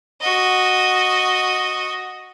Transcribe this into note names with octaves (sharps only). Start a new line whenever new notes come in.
F#4 D#5